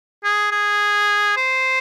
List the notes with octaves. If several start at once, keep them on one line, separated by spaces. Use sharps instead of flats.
G#4
G#4
C5